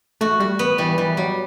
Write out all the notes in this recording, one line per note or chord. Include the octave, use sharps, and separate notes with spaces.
A3 F#4
G3 F#4
B3
E3 G3
E3 G3
F#3 G3